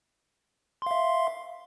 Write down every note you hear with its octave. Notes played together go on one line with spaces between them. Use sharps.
E5 F5 C6